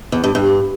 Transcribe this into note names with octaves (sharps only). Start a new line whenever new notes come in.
E2
G2
G2